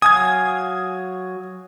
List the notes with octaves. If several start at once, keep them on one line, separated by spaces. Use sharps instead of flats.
F#3 F5 G#5 D#6 G#6